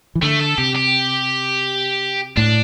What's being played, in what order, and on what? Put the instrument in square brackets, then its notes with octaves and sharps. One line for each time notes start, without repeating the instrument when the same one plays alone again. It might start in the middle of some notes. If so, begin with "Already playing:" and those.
[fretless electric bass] E3
[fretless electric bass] D3 [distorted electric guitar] A3
[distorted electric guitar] A4
[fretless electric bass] C3 [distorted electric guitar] G4
[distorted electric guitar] G4
[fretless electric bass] A2 [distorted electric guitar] D4